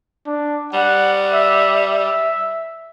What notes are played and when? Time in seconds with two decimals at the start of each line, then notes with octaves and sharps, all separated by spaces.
0.27 D4
0.73 G3 F#5
1.34 E5
1.86 E5